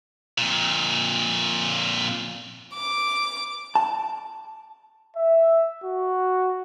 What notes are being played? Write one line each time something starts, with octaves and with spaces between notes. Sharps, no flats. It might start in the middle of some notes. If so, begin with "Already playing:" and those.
F2 A#2
D6
A5
E5
F#4